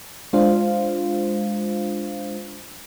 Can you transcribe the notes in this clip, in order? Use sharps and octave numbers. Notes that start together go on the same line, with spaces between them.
G#3 D4 F4 C5 F5